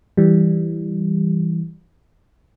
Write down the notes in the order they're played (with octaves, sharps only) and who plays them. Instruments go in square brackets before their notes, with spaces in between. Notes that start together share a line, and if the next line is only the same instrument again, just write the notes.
[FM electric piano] E3 G3